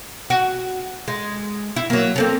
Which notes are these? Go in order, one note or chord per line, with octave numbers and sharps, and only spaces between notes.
F#4
G#3
E4
F#3 A#3
A#3 C4 A4